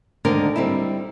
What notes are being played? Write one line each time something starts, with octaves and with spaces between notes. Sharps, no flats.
D2 G#2 D3 D#3 D4 A#4
G3 C4 D#4 E4